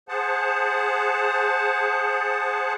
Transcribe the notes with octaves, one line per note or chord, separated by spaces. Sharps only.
G#4 C5 F#5 A5